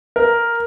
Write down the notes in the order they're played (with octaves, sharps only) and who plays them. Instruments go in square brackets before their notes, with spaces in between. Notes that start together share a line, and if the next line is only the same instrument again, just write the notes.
[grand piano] A#4